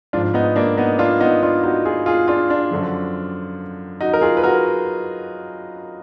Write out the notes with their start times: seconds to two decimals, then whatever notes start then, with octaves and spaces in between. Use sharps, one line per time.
0.13 G#2 F3 D4 F4
0.34 B3 D#4
0.56 A#3 D4
0.77 B3 D#4
0.99 D4 F4
1.21 B3 D#4
1.43 D4 F4
1.64 D#4 F#4
1.85 F4 G#4
2.06 F4 G#4
2.28 D4 F4
2.49 D4 F4
2.71 F#2 D3 F3
4.01 D#4 F#4
4.13 A#4
4.21 F4 G#4
4.37 B4
4.43 F#4 A#4